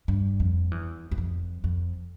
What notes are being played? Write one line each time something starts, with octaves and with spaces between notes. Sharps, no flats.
G2
F2
E2
E2
F2
F2